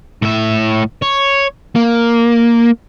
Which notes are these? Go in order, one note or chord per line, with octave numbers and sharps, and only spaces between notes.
A2 E5
C#5
A#3